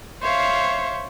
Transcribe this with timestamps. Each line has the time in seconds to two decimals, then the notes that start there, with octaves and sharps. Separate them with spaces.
0.22 C5 C#5 E5 F5